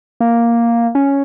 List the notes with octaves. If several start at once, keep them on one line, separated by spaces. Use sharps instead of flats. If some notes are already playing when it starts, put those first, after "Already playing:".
A#3
C#4